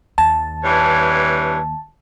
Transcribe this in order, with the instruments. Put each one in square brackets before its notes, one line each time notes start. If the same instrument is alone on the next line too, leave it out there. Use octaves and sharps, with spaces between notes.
[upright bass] D#2 [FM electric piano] A5
[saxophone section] G2 E3 C#5